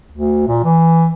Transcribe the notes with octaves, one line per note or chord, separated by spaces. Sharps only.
D2
A#2
E3